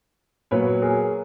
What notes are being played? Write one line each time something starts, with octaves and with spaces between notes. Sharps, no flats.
A#2 F#3 B3 B4 C#5
G#4 A#4